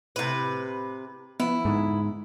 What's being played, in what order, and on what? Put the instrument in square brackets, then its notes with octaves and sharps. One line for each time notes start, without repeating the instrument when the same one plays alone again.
[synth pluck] A2 E4 [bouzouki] C3 B4
[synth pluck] F3 B3 [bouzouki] E4
[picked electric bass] G#2 [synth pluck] D3 B3